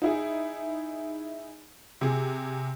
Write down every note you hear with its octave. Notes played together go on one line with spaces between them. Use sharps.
D#4 E4 G#4
C3 G#4